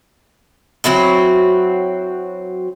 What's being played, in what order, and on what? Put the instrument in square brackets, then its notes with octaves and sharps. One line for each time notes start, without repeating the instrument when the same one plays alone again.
[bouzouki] F#3 C4 E4 F#4